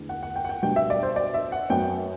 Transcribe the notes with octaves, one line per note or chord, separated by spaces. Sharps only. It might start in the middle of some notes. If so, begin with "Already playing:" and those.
Already playing: E2 D3 A3
F#5
F#5
G5
F#5
G5
B2 G3 D4 G5
E5
D5
C5
D5
E5
F#5
F#2 F#3 B3 G5